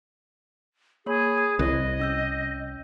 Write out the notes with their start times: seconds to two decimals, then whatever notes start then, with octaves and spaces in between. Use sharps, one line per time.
1.06 A#3 G#4 C#5 B5
1.38 D#6
1.59 C2 D#5 F#6 G#6
2.00 C#4 E6 G6